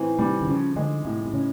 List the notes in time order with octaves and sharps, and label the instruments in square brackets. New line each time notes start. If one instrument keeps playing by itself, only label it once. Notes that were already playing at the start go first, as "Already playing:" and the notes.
Already playing: [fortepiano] A2 E3 C4
[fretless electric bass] C3 [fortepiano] G3
[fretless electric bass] D3
[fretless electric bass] C#3 [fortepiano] F3
[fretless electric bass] D3 [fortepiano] G#3
[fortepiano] A2 [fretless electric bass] C3
[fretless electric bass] C3
[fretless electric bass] C#3 [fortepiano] C#4